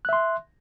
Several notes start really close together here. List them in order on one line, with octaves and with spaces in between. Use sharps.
F#6 E5 C6